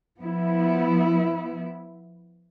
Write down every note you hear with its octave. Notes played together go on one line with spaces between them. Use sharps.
F3 B3 E4